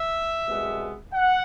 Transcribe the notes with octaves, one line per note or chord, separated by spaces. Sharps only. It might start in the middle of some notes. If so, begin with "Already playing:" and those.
Already playing: E5
C2 B2 G#3 B3
F#5